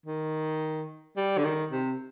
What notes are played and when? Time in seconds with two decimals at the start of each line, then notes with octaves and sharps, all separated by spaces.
0.06 D#3
1.17 G3
1.38 D3
1.44 D#3
1.72 C3